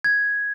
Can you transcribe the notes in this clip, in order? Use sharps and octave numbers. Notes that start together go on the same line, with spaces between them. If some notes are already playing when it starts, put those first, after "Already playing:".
G#6